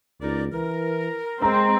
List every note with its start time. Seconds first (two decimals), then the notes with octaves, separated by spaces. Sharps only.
0.21 C#2 D#4 A#4 D5
0.52 E3 A#4
1.42 G#3 C4 A#5